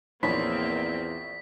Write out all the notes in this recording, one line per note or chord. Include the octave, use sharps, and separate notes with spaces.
A#1 E2 A#3 C4 C#5 B5 B6